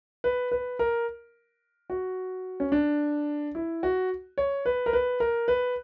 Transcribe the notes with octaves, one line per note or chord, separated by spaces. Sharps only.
B4
B4
A#4
F#4
C#4
D4
E4
F#4
C#5
B4
A#4
B4
A#4
B4